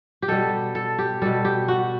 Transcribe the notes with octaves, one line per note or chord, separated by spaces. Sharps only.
G4
B2 G3 A4
A4
G4
B2 G3 A4
G4
F#4